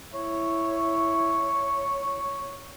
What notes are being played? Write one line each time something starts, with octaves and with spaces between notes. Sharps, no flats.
E4 C#5